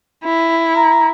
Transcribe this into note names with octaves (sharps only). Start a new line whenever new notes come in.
E4
A#5